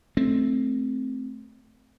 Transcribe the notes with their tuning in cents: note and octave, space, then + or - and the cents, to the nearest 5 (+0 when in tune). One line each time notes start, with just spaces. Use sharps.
A3 -5 C4 +0